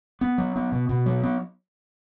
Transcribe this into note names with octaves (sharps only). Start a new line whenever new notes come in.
B3
F#3
B3
B2
B2
F#3
B3